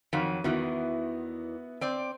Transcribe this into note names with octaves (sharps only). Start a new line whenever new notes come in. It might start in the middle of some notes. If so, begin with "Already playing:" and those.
F2 D#3 F#3
E2 D#3 E3 B3 E4 F#4
C4 D5